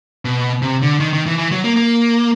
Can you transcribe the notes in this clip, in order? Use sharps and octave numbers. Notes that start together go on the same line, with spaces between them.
B2
C3
D3
D#3
D#3
E3
E3
F#3
A#3
A#3